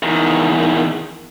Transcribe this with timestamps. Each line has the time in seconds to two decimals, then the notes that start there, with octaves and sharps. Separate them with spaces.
0.03 E2 D#3